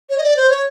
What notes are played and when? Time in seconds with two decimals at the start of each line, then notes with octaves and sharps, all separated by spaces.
0.10 C#5
0.18 D#5
0.23 D5
0.37 C5
0.50 C#5